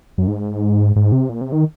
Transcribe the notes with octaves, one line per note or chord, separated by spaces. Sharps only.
F#2
G#2
G#2
C3
A#2
C3
D#3